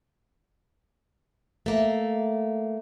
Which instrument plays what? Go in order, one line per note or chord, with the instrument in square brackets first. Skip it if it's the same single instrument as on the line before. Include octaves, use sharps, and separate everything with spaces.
[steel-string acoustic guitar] A3 A#3